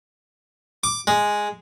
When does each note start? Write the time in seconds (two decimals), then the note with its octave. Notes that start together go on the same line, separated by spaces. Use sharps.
0.84 D6
1.07 G#3